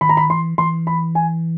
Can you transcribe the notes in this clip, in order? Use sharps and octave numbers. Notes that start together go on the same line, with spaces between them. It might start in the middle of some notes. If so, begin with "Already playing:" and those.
D#3 B5
A#5
B5
E3 C6
E3 C6
B5
G#5